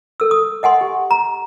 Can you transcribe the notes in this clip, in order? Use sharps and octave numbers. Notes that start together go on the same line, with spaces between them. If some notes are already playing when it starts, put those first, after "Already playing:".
A4 E6
D#6
D#5 F#5 G#5 C6
G4
A#5